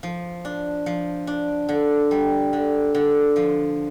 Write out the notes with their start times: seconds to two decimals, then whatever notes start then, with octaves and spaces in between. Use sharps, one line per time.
0.03 F3
0.45 D4
0.86 F3
1.27 D4
1.69 D3
2.11 G3
2.53 D3
2.95 D3
3.36 F3